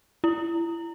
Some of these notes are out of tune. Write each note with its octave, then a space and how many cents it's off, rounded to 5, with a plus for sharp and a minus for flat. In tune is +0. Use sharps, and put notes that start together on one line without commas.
E4 +25